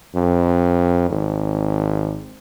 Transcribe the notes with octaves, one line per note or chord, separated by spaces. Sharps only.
F2
G#1